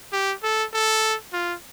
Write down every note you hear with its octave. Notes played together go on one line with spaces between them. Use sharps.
G4
A4
A4
F4